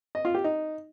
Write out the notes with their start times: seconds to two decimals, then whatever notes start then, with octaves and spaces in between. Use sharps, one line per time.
0.15 D#5
0.25 F4
0.35 G4
0.44 D#4